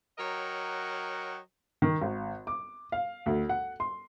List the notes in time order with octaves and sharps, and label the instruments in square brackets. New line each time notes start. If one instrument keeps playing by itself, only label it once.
[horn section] F#3 A#4 C#5 D#5 F#5 G5
[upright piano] D#3
G#1
D6
F5
D2
F#5
C6